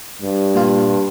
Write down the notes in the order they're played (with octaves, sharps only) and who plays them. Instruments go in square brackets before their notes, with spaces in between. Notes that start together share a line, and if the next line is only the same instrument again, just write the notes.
[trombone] G2
[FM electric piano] A#2 G3 F4